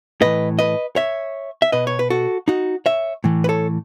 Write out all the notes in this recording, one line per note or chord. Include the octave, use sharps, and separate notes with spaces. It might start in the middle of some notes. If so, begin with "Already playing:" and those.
A2 E3 B4 D#5
B4 D#5
C#5 E5
E5
B2 B4 D#5
C#5
B4
F#4 A4
D#4 F#4
C#5 E5
A2 E3
B4
A4 C#5